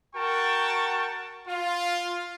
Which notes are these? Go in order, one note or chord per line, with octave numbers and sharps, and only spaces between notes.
F#4 A#4 F#5 G5 A5 C#6
F4